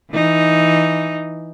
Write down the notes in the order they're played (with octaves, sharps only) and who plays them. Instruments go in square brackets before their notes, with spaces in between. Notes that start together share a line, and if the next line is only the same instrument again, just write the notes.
[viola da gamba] E3 D#4